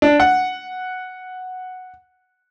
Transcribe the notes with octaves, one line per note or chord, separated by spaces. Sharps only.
D4
F#5